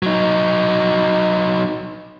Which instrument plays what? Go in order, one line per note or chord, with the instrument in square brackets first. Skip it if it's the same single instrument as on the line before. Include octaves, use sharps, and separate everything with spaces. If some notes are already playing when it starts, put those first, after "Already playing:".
[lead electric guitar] F#3 D#4